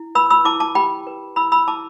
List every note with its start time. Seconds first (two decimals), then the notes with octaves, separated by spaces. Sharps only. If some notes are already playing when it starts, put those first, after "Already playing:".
Already playing: E4
0.15 B4 B5 E6
0.30 B5 E6
0.45 E4 A5 D6
0.60 A5 D6
0.75 G4 G5 B5
1.07 B4
1.36 E4 B5 E6
1.52 B5 E6
1.68 E4 A5 D6